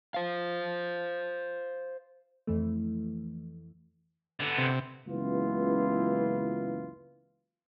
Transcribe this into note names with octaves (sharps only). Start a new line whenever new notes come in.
C5 F5
F2 E3 A3
D3 B3
C3
F#1 C#2 E3 B3 F4